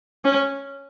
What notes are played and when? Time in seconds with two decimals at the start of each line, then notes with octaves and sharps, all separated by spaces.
0.25 C#4